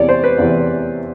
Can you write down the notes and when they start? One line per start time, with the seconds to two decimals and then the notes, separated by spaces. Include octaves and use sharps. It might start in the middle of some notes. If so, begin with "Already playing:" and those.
Already playing: E2 C3 E3 C#5 D5
0.09 C5
0.24 B4
0.38 E2 C3 E3